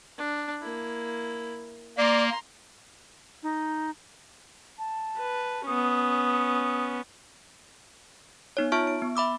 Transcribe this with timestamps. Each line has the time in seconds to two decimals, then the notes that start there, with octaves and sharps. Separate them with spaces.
0.18 D4
0.62 A#3 E4
1.97 A#3 D5 A#5 C6
3.43 D#4
4.79 A5
5.18 B4
5.67 B3 C#4 D#6
8.57 B3 D#4 C#5
8.72 F4 E5 A5 C#6 F6 D7
8.87 D7
9.02 B3
9.16 E5 B5 D6 E6